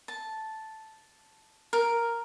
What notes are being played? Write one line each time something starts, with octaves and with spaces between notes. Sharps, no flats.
A5
A#4